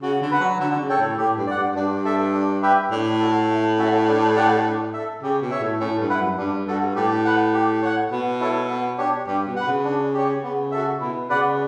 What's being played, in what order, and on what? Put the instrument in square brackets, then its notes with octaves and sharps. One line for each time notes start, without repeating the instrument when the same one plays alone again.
[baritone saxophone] C#3 [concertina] F#4
[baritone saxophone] D3
[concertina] B4 F#5
[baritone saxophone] F#3
[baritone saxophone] D3 [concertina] F#4
[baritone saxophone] D3
C#3
[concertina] A4 C#5 G5
[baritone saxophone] A2
[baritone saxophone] A2 [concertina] G4
[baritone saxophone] G2
[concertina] D5 F#5
[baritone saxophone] G2
[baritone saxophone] G2 [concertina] D4
[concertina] A4 E5
D4
G4 B4 E5 G5
[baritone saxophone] A2 [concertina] D4
[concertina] F#4 A4
A3
C#4 F#4 A4 E5
D4
G4 D5 F#5
D4
A4 E5
[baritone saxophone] C#3 [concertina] G4
[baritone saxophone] B2
[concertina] C#5 E5
[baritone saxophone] A2
[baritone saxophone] A2 [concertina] C#4
[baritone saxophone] G2
[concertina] E4 B4 F#5
[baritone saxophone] F#2
[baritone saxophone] G2 [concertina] D4
[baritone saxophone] G2 [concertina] F#4 A4
[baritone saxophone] A2 [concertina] G4
[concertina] B4 F#5
G4
C#5 F#5
[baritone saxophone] B2 [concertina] B3
[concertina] E4 A4 C#5
B3
D4 G4 C#5
[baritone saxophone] G2 [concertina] G4
[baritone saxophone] B2
[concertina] B4 F#5
[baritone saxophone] C#3
[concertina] D4
G4 C#5
[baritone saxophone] C#3 [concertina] B3
[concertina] F#4 A4 E5
[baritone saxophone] B2 [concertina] E4
[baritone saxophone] C#3 [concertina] B4 D5 F#5